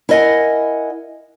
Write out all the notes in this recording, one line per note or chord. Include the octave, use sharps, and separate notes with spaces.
E4 A#4 D#5 F#5 G#5